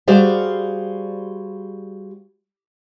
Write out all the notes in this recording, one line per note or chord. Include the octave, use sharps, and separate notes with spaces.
G3 F#4 G#4 C5 D5 F5